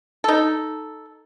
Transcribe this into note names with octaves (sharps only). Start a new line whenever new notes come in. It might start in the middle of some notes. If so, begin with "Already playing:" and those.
D#4 A4